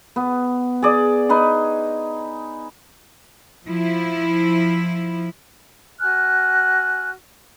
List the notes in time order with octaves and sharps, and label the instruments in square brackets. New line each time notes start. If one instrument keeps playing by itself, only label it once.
[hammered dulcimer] B3
G#4 D5
D#4 B4 C6
[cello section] F3 E4
[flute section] F#4 G#5 F6 F#6